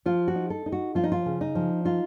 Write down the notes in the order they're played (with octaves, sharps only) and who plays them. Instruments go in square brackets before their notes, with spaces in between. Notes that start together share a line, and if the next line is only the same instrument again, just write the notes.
[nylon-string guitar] F3 F4
F#4
D#4
A4
D#4
F#4
F3 F4
D#4
F4
C#3
D#4
F3
D#4 F4